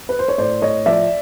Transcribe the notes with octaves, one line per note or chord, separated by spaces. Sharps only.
B4
C5
C#5
A2 C5 D5
A2 C#5 D#5
F3 D5 E5